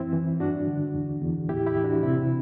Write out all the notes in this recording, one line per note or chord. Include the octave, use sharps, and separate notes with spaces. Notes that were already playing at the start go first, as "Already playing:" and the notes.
Already playing: F#2 E3 C4 E4
E3
G2 D4 F#4
D3
E2
E2
A2 E4 G4
E4 G4
E3
D4 F#4
C3 C4 E4